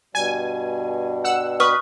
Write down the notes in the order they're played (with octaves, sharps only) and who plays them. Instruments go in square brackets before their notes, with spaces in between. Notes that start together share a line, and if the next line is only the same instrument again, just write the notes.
[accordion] G2 B2 G3 [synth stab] G#5
[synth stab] F#5 E6
[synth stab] B4 [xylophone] C#6 D#6 F6